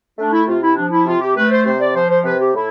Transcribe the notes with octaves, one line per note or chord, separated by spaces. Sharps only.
A3 D4
E4
C3 F4
E4
F3 D4
E4
C3 F4
G4
A3 B4
C5
C3 C5
D5
F3 C5
C5
C3 B4
G4
A2 E4